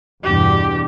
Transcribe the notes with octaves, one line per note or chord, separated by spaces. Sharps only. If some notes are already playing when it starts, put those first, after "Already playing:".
E2 G2 B2 G4